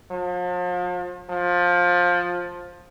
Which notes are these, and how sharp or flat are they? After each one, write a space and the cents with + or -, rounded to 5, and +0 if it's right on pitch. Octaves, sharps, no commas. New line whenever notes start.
F3 +40
F3 +15